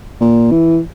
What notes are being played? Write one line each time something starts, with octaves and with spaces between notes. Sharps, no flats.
A#2
E3